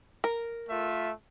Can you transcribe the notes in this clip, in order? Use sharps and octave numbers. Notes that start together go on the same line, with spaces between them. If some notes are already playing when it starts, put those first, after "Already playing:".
A#4
A3 F4 E5